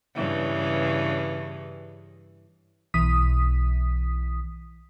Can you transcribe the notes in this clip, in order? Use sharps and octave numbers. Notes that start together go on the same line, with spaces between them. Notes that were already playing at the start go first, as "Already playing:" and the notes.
G2 C#3 E3
B1 E3 D#6 B6